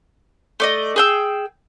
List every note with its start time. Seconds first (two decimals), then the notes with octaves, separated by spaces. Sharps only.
0.60 A3 D5 D#5
0.96 G#4 G5 E6